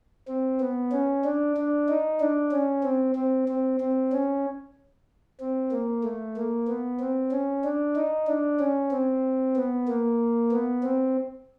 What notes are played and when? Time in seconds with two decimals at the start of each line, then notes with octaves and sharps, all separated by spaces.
0.28 C4
0.60 B3
0.92 C#4
1.25 D4
1.57 D4
1.89 D#4
2.20 D4
2.52 C#4
2.84 C4
3.16 C4
3.49 C4
3.81 C4
4.12 C#4
5.40 C4
5.72 A#3
6.04 A3
6.37 A#3
6.68 B3
7.00 C4
7.31 C#4
7.64 D4
7.96 D#4
8.27 D4
8.60 C#4
8.91 C4
9.56 B3
9.88 A#3
10.52 B3
10.83 C4